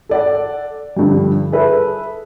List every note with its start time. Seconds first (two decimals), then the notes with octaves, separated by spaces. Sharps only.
0.09 A4 D5 F#5
0.96 G2 D3 F3 G3
1.52 G#4 A4 B4 E5